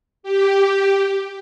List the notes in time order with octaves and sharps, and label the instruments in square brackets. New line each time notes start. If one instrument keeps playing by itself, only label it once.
[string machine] G4